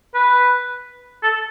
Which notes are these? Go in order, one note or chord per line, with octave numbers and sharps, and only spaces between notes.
B4
A4